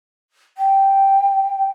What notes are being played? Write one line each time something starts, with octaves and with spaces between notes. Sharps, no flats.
G5